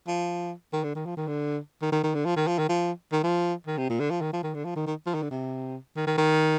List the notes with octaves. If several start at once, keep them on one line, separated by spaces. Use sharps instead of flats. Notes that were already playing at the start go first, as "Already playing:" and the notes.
F3
D#3
D3
D#3
F3
D#3
D3
D#3
D#3
D#3
D3
F3
D#3
F3
D#3
F3
D#3
F3
D#3
C3
A#2
D3
F3
D#3
F3
D#3
D3
F3
D#3
D#3
F3
D#3
D3
C3
D#3
D#3
D#3